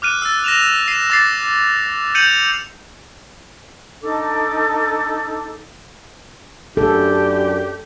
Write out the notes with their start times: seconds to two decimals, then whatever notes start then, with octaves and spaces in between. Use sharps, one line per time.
0.02 D6 F6 F#6 D#7
0.22 E6 A6
0.44 A#6 E7 F7
0.88 C7 D#7 E7
1.10 D6 A6 C7
2.15 G6 C#7 D#7 F7 F#7
4.02 D4 D#4 A4 D6
6.77 F#2 D4 G4 A4